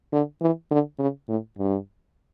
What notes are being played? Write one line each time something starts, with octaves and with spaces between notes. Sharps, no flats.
D3
E3
D3
C#3
A2
G2